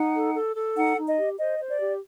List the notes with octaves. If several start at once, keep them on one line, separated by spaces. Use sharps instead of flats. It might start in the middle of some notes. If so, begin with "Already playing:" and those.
Already playing: D#4 F#5
A4
A4
A4
D#4 F#5
D#4
D#5
G4
C5 D#5
C5
D5
G4